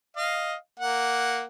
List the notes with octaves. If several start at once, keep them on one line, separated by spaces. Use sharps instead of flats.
D#5 F5
A#3 F#5